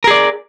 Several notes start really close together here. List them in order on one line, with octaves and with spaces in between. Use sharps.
A#4 G#4 D5